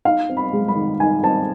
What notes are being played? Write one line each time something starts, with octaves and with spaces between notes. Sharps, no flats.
D#4 F5
C4
B5
G#3
B5
D#3
D#4 G#5
C4 A5